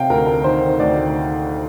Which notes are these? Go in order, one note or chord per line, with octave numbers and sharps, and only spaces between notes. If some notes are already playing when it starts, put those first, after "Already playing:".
Already playing: C3 F5 G5
D2 A#4
A#4
D#3 C5
D2 D5